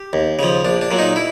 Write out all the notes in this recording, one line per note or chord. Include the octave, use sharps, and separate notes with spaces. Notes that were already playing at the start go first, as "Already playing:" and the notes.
Already playing: G4
D#2
C#3 F3
A#1 D4
D4
A#2 F#3
D#4
E4